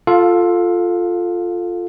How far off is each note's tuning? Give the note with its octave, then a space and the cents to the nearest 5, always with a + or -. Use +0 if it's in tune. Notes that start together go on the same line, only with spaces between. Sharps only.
F4 +0 A4 +0 F5 +25